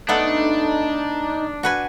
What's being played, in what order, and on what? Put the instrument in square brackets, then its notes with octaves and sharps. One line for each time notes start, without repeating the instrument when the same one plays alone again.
[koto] A3 B3 A4 [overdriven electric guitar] D4 [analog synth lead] D#4
[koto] F#4 B4 G#5